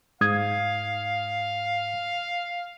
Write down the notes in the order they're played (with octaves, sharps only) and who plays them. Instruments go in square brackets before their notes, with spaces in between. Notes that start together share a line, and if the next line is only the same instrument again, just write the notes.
[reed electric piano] G#2 D#6 G#6 [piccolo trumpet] F5